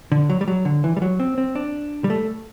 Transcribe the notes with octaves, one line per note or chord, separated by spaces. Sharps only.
D3
F#3
G3
F#3
D3
E3
G3
F#3
C4
C4
D4
G3
A3